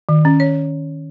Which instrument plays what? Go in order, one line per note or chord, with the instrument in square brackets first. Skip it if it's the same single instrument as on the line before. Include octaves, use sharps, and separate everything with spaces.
[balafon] D#3
C#4
C#5